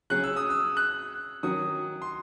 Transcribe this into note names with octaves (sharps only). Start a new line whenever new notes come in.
C#3 F#3 C#4 G#4 F#6
E6
D#6
E6
F#6
D#3 F#3 C#4 F#4 D#6
C6